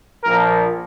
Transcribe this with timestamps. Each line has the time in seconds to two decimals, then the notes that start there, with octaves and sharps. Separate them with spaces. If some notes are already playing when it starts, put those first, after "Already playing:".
0.24 A#1 A#2 F3 A#4